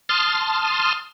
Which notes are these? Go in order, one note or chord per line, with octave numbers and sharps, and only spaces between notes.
A5 C6 D#6 F6